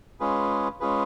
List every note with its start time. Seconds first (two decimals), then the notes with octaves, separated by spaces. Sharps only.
0.20 G#3 C#4 F4 G#4 B4
0.80 G#3 C#4 F4 G#4 B4